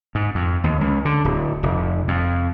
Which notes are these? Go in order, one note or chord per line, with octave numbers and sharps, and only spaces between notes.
G#2
F2
D#2
C#2
D3
D1
F1
F2